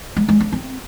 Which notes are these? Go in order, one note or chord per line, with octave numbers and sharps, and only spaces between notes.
G#3
G#3
D4
C4